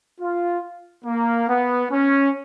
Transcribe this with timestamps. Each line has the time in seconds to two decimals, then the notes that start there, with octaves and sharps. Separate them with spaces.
0.19 F4
1.05 A#3
1.48 B3
1.90 C#4